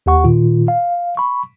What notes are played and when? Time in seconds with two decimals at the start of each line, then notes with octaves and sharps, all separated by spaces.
0.06 D#2 G4 F#5 C#6
0.24 A#2 D#3 F4
0.68 F5
1.17 B5 C#6